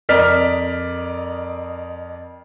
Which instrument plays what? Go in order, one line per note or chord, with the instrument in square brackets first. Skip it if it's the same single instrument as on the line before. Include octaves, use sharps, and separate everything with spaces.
[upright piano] F2 A#4 D5 D#5 F6 B6